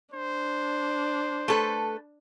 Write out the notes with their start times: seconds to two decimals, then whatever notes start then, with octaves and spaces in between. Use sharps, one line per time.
0.14 D4 C5
1.48 A3 A4 B4